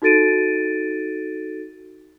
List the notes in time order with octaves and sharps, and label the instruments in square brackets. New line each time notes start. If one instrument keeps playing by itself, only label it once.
[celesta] D#4 F#4 A4 A6 D7 D#7